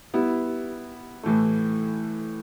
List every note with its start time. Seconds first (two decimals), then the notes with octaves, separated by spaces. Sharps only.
0.14 G3 B3 E4
1.23 A2 E3 A3